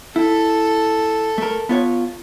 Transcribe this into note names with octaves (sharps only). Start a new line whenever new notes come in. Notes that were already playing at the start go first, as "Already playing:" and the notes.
E4 A4
A3 A#4
B3 F4 C#5